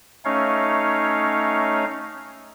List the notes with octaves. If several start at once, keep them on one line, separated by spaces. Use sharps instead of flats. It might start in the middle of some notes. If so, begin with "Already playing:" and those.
A3 C#4 D#4 C#5 F5